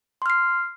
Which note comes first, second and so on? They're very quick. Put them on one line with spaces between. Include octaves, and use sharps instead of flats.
C6 F6 C7